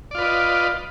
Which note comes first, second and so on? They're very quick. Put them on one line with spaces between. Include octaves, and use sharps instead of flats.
D5 F4 B4 D#5